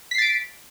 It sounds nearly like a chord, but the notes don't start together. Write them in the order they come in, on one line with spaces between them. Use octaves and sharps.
B6 C7 A6 D7